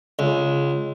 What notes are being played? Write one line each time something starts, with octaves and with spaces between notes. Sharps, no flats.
C#2